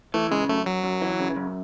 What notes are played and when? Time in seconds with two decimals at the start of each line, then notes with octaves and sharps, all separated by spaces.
0.14 E3 A3
0.31 C#3 G#3
0.49 F#2 A3
0.66 F#2 F#3
0.84 F#2
1.02 E3
1.20 C#3
1.36 F#2